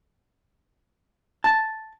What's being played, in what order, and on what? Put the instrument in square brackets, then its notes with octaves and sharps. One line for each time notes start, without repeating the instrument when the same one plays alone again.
[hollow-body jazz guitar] A5